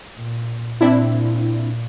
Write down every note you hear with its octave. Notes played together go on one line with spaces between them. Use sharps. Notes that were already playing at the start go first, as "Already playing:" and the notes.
A#2
A#2 C4 D4 E4